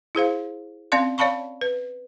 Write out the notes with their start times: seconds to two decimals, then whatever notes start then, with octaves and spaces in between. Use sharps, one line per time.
0.15 E4 G#4 C5 F5
0.92 C4 C#4 D5 F5 C6
1.18 C#5 D5 F5 A5 B5 C#6
1.61 B4